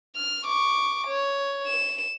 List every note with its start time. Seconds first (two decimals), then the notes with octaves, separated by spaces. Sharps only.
0.16 F6
0.45 C#6 D6
1.07 C#5
1.67 E7